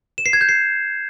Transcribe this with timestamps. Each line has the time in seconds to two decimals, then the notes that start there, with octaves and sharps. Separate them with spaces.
0.18 E7
0.26 C7
0.33 G#6
0.41 G6
0.49 C7